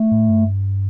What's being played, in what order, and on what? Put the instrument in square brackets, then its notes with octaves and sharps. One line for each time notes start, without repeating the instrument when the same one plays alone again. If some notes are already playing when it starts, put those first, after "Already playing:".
Already playing: [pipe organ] A3
[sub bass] A2
G2